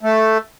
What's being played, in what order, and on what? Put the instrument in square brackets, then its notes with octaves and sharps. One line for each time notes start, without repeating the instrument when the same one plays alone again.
[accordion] A3